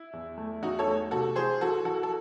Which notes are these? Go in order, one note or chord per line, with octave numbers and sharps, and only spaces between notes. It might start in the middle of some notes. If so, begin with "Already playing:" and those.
Already playing: E4
E2
A3
E2 D#4 F#4
A4 C#5
A3
C3 F#4 A4
E3 G#4 C5
E3 F#4 A4
E3 F#4 A4
A4